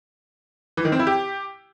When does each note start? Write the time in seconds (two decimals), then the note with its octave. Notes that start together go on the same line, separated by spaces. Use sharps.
0.77 E3
0.85 D#3
0.92 C4
0.99 E4
1.07 G4